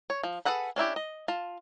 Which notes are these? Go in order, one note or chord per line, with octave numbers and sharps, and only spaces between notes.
C#5
F3
G#4 A4 B4 F#5 B5
C#4 D4 E4 G4
D#5
F4 A5